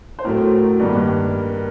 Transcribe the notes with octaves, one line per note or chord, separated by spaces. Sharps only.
C5
A2 F#3 A3 A#4
G2 D#3 G3 A#3